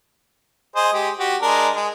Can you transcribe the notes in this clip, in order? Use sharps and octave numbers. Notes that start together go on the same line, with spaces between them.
G#4 C5 D#5
G#3 G4
F#4 G4
G#3 D4 A#4
G#3